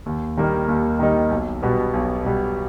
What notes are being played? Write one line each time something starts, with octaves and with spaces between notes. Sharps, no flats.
D#2
D#3 G3 A#3 D#4
D#2
D#3 G3 A#3 D#4
B1
B2 G3 B3
B1
B2 G3 B3